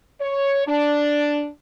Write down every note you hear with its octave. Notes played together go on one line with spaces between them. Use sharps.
C#5
D4